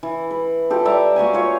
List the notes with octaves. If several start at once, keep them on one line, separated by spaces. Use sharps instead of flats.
E3
B4
F4 G4 A4
G3 D5 E5 A#5
A#3 F#4 G4 G#5
F4 C#5 F5